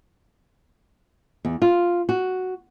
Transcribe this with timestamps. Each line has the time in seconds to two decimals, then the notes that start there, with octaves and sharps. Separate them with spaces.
1.45 E2
1.62 F4
2.09 F#4